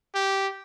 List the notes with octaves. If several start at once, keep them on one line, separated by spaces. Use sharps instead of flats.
G4